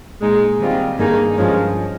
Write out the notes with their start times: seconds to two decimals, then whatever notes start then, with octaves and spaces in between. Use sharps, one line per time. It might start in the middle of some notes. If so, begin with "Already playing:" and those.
0.21 A#2 G#3 D#4 G#4
0.60 D#3 G3 C4 F4
0.98 G2 D#3 A#3 D#4 G#4
1.37 G2 F3 G#3 C#4